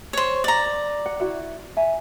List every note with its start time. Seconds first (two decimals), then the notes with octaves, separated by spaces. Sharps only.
0.13 C5 C#5
0.44 D5 A#5
1.06 F#5
1.20 E4 F#4 E5
1.77 E5 G#5 A#5